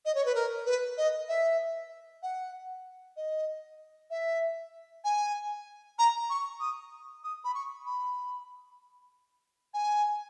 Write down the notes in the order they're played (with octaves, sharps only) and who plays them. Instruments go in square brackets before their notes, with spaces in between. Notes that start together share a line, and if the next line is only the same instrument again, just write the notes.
[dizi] D#5
C#5
B4
A#4
B4
D#5
E5
F#5
D#5
E5
G#5
A#5
C#6
D#6
D#6
B5
C#6
B5
G#5